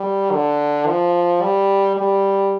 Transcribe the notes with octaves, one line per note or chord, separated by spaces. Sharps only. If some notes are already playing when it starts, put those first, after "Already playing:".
Already playing: G3
D3
F3
G3
G3